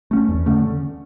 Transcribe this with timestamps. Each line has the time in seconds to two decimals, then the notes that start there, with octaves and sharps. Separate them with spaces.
0.11 A3 C#4
0.29 E2
0.46 D3 A3 C#4